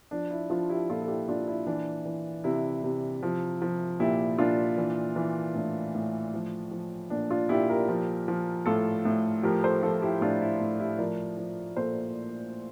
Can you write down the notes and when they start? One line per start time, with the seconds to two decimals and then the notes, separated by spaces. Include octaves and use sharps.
0.11 F3 D4
0.31 E4
0.50 F3 D4 F4
0.70 E4 G4
0.89 A#2 F4 A4
1.02 A4
1.08 E4 G4
1.28 A#2 D4 F4
1.48 E4
1.66 E3 D4
2.05 E3
2.44 C3 E4
2.84 C3
3.23 F3
3.62 F3
4.00 A#2 E4 G4
4.39 A#2 D4 F4
4.78 E3
5.16 E3
5.55 A2 D4
5.95 A2
6.34 F3
6.71 F3
7.10 A#2 D4
7.30 D4 F4
7.49 A#2 E4 G4
7.69 G4 A#4
7.89 F3
8.28 F3
8.66 A2 F4 A4
9.05 A2
9.43 F3 G4 A#4
9.63 A4 C5
9.82 F3 F4 A4
10.02 E4 G4
10.21 A2 D4 F4
10.41 E4
10.60 A2
10.79 E4 G4
10.99 F3 A#4 D5
11.38 F3
11.77 A#2 A4 C5